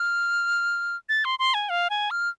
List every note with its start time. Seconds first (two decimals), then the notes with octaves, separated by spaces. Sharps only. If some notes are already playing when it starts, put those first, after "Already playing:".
Already playing: F6
1.09 A6
1.25 C6
1.39 C6
1.54 G#5
1.69 F5
1.90 G#5
2.11 F6